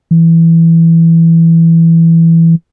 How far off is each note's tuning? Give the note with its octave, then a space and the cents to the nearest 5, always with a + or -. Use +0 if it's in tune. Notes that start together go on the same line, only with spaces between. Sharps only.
E3 +5